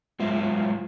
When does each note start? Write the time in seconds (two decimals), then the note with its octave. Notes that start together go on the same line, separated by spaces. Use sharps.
0.20 F#3 G#3 F4 C5 E5